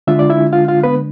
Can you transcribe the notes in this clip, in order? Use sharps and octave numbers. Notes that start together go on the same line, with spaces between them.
D3 G#3 D4 F4 E5
D5
E4 E5
F4 F5
F4 F5
B3 B4